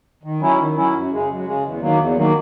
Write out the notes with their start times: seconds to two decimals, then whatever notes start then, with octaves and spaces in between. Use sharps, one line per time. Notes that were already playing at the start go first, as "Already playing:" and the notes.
0.23 D#3
0.40 F#3 C#4 E4
0.58 D#3
0.76 F#3 C#4 E4
0.93 F#2
1.11 C#3 G#3
1.28 F#2
1.46 C#3 G#3
1.63 E2
1.81 D#3 F#3 A#3
1.99 E2
2.16 D#3 F#3 A#3